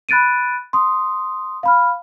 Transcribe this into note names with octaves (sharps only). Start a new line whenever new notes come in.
B5 F#6 A6 D7 D#7
C6 D#6
F5 B5 F6